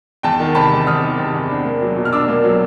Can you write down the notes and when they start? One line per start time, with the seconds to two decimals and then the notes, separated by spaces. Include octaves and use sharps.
0.23 E2 G5 A5
0.40 D#3
0.55 C3 A5 B5
0.71 E2
0.87 E2 D#6 F6
1.02 D#3
1.18 C3
1.34 E2
1.50 D4
1.65 A#3
1.81 F#3
1.97 B2
2.05 F6
2.12 D4 D6 E6
2.28 A#3
2.44 F#3